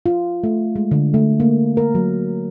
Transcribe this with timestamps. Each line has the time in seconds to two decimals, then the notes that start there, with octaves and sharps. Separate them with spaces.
0.06 F4
0.44 A3
0.76 G#3
0.91 D3
1.14 A3
1.40 A#3
1.77 A#4
1.95 F#3